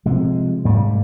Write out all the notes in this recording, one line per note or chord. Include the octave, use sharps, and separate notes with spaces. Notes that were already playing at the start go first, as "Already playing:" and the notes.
C3 F3 G#3
G#2 G3 A#3